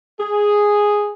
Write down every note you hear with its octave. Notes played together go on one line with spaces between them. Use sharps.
G#4